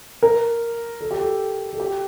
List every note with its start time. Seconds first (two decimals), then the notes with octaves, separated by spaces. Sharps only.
0.23 A#4
1.01 A4
1.11 G4
1.20 A4
1.73 A4
1.80 G4